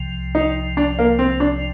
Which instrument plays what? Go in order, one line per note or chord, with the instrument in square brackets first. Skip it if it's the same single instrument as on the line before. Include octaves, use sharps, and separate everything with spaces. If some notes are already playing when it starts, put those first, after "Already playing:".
Already playing: [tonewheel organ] C2 C3 F3
[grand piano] D#4
D4
A#3
C4
D4